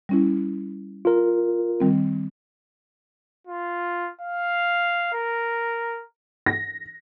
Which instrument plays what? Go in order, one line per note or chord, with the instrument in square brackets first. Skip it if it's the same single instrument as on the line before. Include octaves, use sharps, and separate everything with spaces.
[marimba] G3 C#4 E4
[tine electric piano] F4 A#4
[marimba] D#3 G3 C4
[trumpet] F4
F5
A#4
[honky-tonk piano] A#6